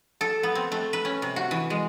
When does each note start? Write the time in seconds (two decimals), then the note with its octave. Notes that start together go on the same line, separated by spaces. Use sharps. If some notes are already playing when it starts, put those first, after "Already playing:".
0.21 A4
0.43 B3
0.55 C4
0.72 A3
0.93 B4
1.05 C#4
1.22 C3
1.36 F#4
1.51 E3
1.70 G#3